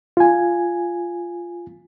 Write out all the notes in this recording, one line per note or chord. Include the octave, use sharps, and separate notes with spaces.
F4 G#5